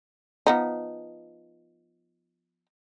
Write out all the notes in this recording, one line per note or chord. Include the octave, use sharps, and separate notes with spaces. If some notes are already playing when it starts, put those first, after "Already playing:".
F3 B3 D#4